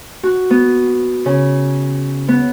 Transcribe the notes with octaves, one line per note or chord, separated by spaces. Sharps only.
F#4
B3
C#3
B3